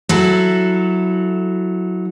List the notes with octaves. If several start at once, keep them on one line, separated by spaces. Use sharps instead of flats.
F#3 E4 A4